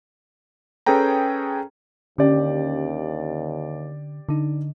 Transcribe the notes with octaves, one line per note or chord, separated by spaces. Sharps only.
C#4 G#4 A4 B4 G5 A#5
D#2 D3 C#4 G4 D5
D3 D#4